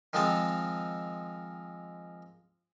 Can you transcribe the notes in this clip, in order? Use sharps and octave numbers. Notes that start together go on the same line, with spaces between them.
D#3 F3 G#3 C4 A5